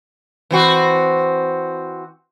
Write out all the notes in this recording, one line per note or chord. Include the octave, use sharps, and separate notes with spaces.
E3 C4 F#4